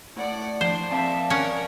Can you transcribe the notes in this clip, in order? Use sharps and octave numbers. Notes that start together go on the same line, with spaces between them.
A2 D5 F#5
F3 D4 C5
C4 D5 E5 F5 A5
C#4 A#4 F#5 D#6